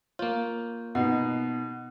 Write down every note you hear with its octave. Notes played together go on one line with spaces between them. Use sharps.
A#3 F4 C#5
B2 D#4 F#5